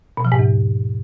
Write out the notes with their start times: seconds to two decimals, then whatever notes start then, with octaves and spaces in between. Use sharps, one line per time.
0.17 B2
0.25 F3
0.32 G#2
0.39 E2